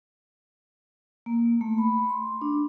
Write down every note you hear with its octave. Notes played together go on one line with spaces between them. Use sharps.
A#3
A3
B5
C6
D4